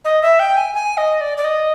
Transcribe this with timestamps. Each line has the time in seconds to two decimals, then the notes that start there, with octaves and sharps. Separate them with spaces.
0.05 D#5
0.22 E5
0.39 G5
0.57 G#5
0.74 G#5
0.97 D#5
1.21 D5
1.37 D5
1.44 D#5